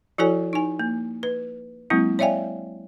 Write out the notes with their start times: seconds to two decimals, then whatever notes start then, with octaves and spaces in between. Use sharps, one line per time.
0.18 F3 E4 F#4 A4 C#5 G#5
0.53 D#4 G#5
0.79 A#3
1.23 B4
1.90 F#3 G#3 A#3 C4 E4
2.19 C#5 D5 E5 F5 G5 G#5